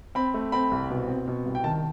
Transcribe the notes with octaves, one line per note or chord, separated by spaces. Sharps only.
C4 B5
A3
C4 B5
C2
B2
C4
B2
C2
G5
D#3 A5